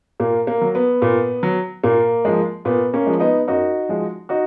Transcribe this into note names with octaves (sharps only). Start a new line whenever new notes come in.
A#2 A#3
A#3
F#3
B3
A#2
F#3
A#2 A#3
F3 G#3
A#2 B3
A#3 C#4
F3 G#3
B3 D#4
F#2 D#4 F#4
F3 G#3
D#4 F#4